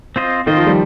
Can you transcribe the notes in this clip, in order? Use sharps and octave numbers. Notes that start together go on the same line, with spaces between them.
C4 F4 C5 D#5
D#3 C4 F4 C5 D#5
F3
G3